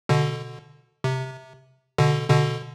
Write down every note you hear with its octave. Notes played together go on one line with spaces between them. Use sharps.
B2 D3
C3
B2 D3
B2 D3